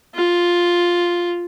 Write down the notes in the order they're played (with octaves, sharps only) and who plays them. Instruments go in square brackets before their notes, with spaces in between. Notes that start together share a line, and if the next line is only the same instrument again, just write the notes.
[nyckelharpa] F4